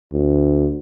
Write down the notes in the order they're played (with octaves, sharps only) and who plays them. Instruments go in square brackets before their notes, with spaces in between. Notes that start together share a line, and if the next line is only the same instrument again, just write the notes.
[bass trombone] D2